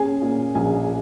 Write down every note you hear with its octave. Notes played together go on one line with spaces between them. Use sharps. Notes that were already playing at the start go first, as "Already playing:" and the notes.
Already playing: C#4 G#4 G#5
A#2
A#1 G#4 G#5